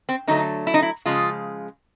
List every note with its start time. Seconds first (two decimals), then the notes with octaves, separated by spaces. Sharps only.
0.09 C4
0.27 D3 F#3 A3 D#4
0.67 E4
0.74 D#4
0.82 E4
1.06 C#3 F3 G#3 F4